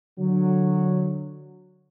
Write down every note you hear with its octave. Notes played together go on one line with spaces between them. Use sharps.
D3 F#3